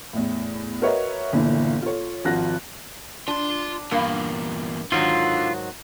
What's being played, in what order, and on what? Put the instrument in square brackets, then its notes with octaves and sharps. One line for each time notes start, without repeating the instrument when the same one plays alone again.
[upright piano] E2 A2
F#4 A#4 B4 C#5 D#5 E5
G1 D#2 A#2 D3 E3 A3
F4 A4 C#5
G#1 F3 F4 F#4 F#6 A#6
[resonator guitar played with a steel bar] D4 [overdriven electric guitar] F4 C6
[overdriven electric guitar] E2 A#2 [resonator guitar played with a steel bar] G2 A#3
[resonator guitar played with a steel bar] G#2 D#3 F#3 [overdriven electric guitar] D3 [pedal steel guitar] F4